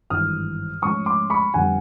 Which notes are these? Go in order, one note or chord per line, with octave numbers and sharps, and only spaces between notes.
G#1 G2 E3 D#6 F6
G#2 F3 A3 C#4 C#6 D#6
C6 D6
B5 C#6
F2 D3 G3 B3 F#5 G#5